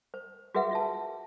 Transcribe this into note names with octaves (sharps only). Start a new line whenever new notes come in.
C5
F#4 G#4 B4 E5 F#5
F4 E5 A5